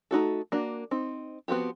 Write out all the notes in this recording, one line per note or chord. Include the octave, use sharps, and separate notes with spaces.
A3 D#4 F#4 A4
A#3 D4 F#4
C4 D#4
F3 B3 C4 F#4 G4